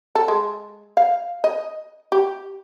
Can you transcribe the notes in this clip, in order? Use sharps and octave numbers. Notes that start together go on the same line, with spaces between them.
A4
G#3
F5
D#5
G4